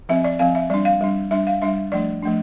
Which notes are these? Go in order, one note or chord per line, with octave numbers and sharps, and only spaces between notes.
F3 C4 E5
D5
F3 C4 F5
E5
G3 D4 D5
F5
G3 D4
G3 D4 E5
F5
G3 D4 E5
F3 A3 D4 D5
F3 A3 D4